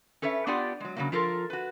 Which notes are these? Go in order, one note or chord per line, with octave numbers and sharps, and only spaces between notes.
C#4 A4 B4 C#5 E5
B3 D4 F4 G4 D5 F#5
F#3 G#3
C#3 F#3 A#3
F3 F4 A4 A#4
F#4 B4